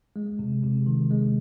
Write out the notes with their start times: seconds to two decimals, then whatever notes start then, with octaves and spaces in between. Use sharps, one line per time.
0.16 G#3
0.39 C3
0.64 C3
0.86 D#3
1.10 G#3